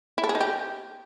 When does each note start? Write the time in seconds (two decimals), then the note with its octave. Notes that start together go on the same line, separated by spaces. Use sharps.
0.18 E4
0.24 A4
0.29 G#4
0.35 D#4
0.41 G4